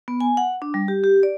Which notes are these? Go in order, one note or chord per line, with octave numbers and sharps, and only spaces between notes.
B3
G#5
F#5
D4
G3
G4
G4
D5